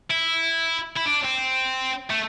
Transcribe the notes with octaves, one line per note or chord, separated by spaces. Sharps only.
E4
E4
D4
C4
A3